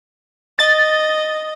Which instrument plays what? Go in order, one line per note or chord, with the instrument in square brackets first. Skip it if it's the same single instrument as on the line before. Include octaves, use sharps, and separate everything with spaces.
[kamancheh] D#5 [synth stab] A6